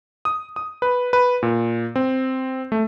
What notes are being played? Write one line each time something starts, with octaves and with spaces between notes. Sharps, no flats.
D#6
D#6
B4
B4
A#2
C4
A3